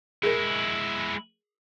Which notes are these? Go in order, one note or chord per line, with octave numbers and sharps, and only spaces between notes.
G#3 E4 G#4 A#4